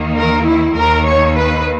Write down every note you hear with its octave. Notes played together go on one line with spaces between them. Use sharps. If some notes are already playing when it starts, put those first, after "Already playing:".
Already playing: D#2 D#3 A#3
A#4
E4
D#2 D#3 A#3 A#4
C#5
B4